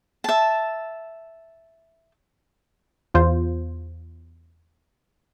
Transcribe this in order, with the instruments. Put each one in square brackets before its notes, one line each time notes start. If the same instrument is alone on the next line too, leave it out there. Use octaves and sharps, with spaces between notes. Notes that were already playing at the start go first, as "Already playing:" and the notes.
[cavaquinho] E5 A5
[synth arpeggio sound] E2 F4 C5